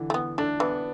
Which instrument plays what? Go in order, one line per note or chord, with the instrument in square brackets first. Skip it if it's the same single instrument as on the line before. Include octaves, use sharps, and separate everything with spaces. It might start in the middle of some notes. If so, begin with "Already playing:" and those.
Already playing: [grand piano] D3 E3
[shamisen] A3
B3
[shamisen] A3 [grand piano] D4
[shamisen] E3 [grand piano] B3